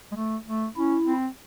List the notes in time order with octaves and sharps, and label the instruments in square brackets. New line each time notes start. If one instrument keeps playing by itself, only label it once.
[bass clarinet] G#3
A3
A3
[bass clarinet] C#4 [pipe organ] E4
[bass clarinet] C4